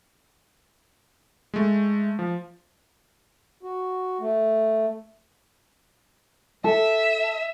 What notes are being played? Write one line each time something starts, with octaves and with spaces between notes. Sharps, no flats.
G#3 A3
F3
F#4
A3
A4 E5